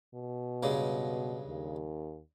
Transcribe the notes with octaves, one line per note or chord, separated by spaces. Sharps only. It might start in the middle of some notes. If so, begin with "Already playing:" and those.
B2
G2 C#3 G#3
D#2